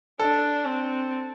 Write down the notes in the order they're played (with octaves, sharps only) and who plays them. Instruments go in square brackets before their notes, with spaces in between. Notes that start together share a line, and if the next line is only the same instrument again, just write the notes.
[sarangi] D4 [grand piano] A4
[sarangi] C4